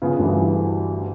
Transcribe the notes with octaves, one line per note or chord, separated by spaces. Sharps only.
C#3 B3 F4 G#4
D2 G2 E3